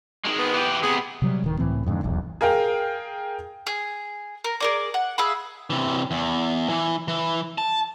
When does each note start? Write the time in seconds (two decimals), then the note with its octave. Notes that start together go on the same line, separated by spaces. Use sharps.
0.25 D#3 G#3
0.38 B3
0.54 E3 G4
0.83 C3 B3 G#4
1.22 C3 F#3 G3
1.44 D1 D#3
1.58 C#2 A2 E3 C4
1.86 F2 G#2 D3
2.03 D#1 B1 E2
2.41 G#4 A#4 F5 G5
3.67 G#4
4.44 A#4
4.60 G#4 A#4 D5
4.94 F#5
5.18 G#4 E5 F5 B5
5.70 C3 E3
6.11 E2
6.69 E3
7.08 E3
7.58 A5